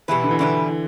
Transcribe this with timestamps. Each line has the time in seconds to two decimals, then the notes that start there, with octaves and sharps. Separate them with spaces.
0.08 B2 E3 G3 E4 B4
0.24 D3
0.31 E3
0.39 B2 D3 G3 E4 B4